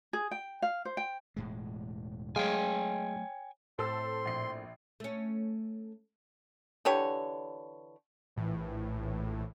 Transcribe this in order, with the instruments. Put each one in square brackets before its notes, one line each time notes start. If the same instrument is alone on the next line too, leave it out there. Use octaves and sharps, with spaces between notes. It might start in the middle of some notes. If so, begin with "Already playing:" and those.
[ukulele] G#4
G5
F5
C5
G5
[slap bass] E1 A2 G#3
[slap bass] F#3 A3 [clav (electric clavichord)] G#3 G#4 F5 [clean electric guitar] C#5 G5 G#5
[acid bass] A2 [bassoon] C4 [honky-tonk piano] A4 E6 [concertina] C6
[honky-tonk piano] A#1 C7
[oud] A3 C#4
[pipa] D3 E3 G4 C#5
[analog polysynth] A#1 A2 E3